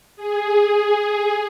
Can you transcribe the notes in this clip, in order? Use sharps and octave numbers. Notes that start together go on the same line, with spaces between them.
G#4